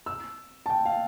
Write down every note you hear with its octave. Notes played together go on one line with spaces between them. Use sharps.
E6
A5
G5
F5